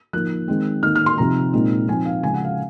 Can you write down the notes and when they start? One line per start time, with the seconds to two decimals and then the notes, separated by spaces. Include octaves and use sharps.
0.13 F3 A#3 D#4 F#6
0.48 D#3 G#3 C4
0.83 D#3 A#3 D#4 F6
0.96 F6
1.06 C6
1.18 C3 F3 C4 D#4 A#5
1.53 A#2 G#3 C4 D#4
1.88 F3 C4 D#4 G#5
2.05 F5
2.23 C#3 F3 G#3 G#5
2.34 F#5
2.44 F5